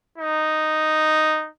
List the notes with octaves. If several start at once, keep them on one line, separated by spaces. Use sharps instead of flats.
D#4